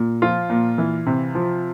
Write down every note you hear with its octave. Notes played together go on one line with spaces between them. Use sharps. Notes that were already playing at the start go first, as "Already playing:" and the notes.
Already playing: A#2
F3 F4
A#2
E3
C3
F3